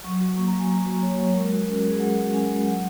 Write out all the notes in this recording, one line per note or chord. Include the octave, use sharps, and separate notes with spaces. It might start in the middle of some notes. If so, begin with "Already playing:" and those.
F#3 C#6
F#4
A#3 C#6
A#5
F#3
G#5
F#3 A#5
F#4
A#3 C#5
F#3
G#3 A#4
F#4
C#4 A#4
F#4
G#3 G#4
G#3 F#5
F#4
C#4 G#5
G#3
F#3 F#5